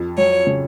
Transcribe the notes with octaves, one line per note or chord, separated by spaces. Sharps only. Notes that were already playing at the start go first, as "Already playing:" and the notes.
Already playing: F2
F#3 C#5
C#3